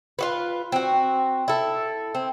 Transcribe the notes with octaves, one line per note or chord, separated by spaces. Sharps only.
F4 F#4 B4
C4 F#4
E4 A4
C4